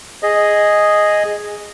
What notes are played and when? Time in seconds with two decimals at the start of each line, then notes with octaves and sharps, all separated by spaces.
0.23 G#4 D#5